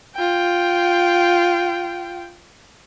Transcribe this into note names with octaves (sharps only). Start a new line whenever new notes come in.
F4 G5